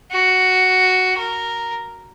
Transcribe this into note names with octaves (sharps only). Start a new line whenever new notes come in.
F#4
A#4